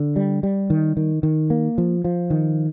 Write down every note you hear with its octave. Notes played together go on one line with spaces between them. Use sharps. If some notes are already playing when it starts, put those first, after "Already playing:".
Already playing: D3
G3
G3
D#3
D#3
D#3
A#3
F3
F3
D#3